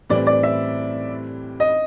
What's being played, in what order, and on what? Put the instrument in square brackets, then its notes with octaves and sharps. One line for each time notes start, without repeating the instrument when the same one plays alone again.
[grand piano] A2 E3 G3 C4 [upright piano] D5
[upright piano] D5
E5
D#5